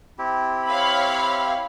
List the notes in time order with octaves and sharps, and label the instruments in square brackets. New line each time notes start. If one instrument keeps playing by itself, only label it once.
[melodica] C4 E4 G4
[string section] C#5 F5 B5